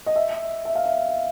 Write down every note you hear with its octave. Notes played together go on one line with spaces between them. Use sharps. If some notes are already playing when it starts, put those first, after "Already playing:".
D#5
E5
E5
F5
E5